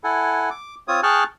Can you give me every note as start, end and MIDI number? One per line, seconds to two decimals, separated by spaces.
0.04 0.50 64
0.04 0.50 69
0.04 0.50 78
0.04 0.50 80
0.50 0.75 86
0.88 1.01 60
0.88 1.01 65
0.88 1.01 73
0.88 1.01 87
1.03 1.24 68
1.03 1.24 79
1.03 1.24 81
1.03 1.24 85
1.03 1.24 89
1.03 1.24 90